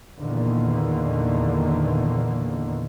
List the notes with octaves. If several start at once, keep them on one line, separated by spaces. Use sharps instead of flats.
E2 A#2 D3 D#3 A#3